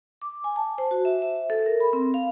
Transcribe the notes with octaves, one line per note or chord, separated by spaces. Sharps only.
D6
G#5
A5
C5
F#4
E5
E5
A4
A#4
B5
C4
F5